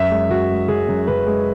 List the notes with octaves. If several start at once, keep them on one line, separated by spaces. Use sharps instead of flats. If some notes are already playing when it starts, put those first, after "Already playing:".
Already playing: F#2 E5
G#3
F#2 F#4
G#3
F#2 G#4
F#2
F#2 B4
G#3